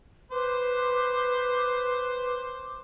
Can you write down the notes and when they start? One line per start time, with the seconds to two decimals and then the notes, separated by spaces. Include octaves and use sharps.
0.31 B4 C5 D6